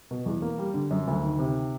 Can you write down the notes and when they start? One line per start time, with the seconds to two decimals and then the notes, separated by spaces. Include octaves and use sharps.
0.11 B2
0.26 E2
0.42 A#3
0.59 G3
0.74 D3
0.91 F#2
1.07 D2
1.22 D#3
1.39 C3